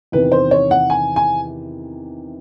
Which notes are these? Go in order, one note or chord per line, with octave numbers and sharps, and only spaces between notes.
E2 C3 D#3 B4
C5
C#5
F#5
G#5
G#5